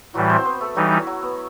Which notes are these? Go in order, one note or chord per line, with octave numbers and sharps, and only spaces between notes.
A2 E3 F#3 G3 F#4
C4 C5
B3 B4
A3 A4
E3 F#3 G3 D#4 F#4
E4
F#3 F#4
B3